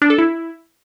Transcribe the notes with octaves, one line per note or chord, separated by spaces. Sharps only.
D4
A4
E4